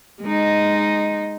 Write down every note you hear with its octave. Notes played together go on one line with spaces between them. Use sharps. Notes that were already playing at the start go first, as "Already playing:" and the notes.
G#3 D#4